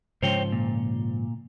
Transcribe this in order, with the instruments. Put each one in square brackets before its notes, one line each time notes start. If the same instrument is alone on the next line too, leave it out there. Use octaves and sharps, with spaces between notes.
[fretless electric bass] G#2 C#3 F3 [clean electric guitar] C5 C#5 G5
[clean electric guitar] A#2